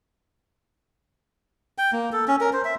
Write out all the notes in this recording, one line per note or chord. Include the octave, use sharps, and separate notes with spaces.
G5
A#3
A4
C#4
A#4
C5
E5